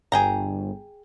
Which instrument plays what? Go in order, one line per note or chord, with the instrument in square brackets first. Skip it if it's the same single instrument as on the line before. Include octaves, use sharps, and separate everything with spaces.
[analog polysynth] G1 [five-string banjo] G#4 G5 A#5